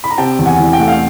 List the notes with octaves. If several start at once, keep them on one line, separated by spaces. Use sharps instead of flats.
B5
A#5
C3 G5 A5
E2
F#5 G#5
E3
G5
A3 F#5
F5 G5